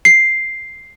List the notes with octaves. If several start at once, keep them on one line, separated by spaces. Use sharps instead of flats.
C7